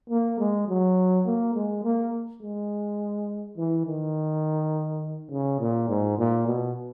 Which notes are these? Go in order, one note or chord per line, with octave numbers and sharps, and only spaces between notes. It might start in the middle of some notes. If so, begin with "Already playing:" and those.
A#3
G#3
F#3
A#3
G#3
A#3
G#3
E3
D#3
C#3
A#2
G#2
A#2
B2